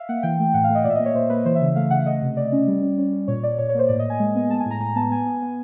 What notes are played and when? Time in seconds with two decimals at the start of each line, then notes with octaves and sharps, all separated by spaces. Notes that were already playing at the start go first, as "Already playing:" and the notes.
Already playing: E5 F5
0.09 A#3 F#5
0.23 E3 G5
0.39 A3
0.54 A2 F#5
0.64 F5
0.70 A3
0.75 D#5
0.84 A#2 D5
0.90 E5
0.95 D#5
1.00 A#3
1.05 C#5
1.14 A#2 C5
1.30 A#3 B4
1.45 E3 C5
1.55 E5
1.61 C#3
1.66 E5
1.76 A3 F5
1.91 C#3 F#5
2.06 A3 D#5
2.22 C3
2.36 A3 D5
2.52 C#4
2.67 G3
2.82 C#4
2.98 C#4
3.13 C#4
3.28 A#2 C#5
3.43 A#2 D5
3.58 A#2 C#5
3.69 C#5
3.75 A#3 C5
3.89 A2 D5
3.99 D#5
4.04 A2
4.10 G#5
4.19 G#3
4.35 B3
4.50 G#3 A5
4.60 G#5
4.66 A2 A#5
4.80 A2 A#5
4.96 B3 A5
5.10 B3 G#5
5.27 B3
5.42 B3